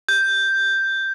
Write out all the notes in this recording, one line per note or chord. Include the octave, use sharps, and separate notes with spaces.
G6